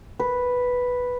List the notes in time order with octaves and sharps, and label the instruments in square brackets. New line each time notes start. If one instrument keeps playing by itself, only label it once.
[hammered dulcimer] B4